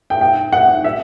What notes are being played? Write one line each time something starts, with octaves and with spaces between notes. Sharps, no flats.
G5
G5
F#5
E5